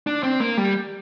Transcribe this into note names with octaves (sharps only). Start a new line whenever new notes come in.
D4
C4
A#3
G3